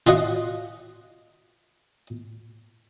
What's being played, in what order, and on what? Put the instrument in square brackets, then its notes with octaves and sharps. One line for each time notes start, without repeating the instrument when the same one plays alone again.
[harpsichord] F4 F#4 D#5 F#5